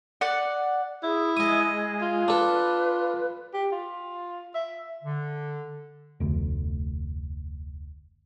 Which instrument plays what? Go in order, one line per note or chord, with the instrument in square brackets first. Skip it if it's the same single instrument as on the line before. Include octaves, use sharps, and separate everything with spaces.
[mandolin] D5 F#5
[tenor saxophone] E4 [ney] G#4
[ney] G#3 [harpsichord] D#5 D#6
[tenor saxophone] F4
[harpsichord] D4 A4 [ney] B4
[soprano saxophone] G4
F4
E5
[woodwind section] D3
[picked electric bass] F1 D2